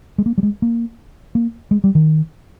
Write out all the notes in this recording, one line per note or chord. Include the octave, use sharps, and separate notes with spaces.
G#3
A#3
G3
G#3
A#3
A#3
G#3
G3
D#3